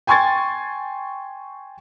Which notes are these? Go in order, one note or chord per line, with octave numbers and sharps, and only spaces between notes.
G5 G#5 C6 C#6 G#6 A6